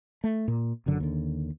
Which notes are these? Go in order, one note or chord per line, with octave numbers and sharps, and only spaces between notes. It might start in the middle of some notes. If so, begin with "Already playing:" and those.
A3
A#2
F#1 F#2 D3 F#3
D#2 D3